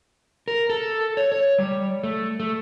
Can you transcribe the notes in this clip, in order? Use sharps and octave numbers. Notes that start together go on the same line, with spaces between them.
A#4
A4
C#5
C#5
G3
A3
A3